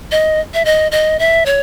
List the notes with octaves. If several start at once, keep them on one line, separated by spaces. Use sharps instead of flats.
D#5
E5
D#5
D#5
E5
C#5